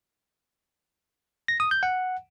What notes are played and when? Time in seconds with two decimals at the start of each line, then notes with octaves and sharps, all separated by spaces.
1.48 A#6
1.60 D#6
1.71 G6
1.83 F#5